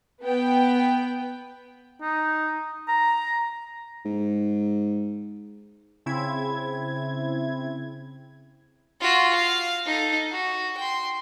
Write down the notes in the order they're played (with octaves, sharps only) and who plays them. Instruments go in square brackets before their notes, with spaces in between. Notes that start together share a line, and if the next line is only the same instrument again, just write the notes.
[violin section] B3 G5
[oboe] D#4
A#5
[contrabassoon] G#2
[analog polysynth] C#3 C4 E4 G#6
[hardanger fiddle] F4 F#4
F5
D#4 A4
F#4
G5 C6